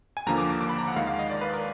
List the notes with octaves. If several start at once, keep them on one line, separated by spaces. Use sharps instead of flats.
G#5
D#2 D3 F3 A#3 A#5
D6
D6
D6
B5
A#5
F#5
D#2 D#3 G#3 F5
F5
D#5
D5
B4
A#4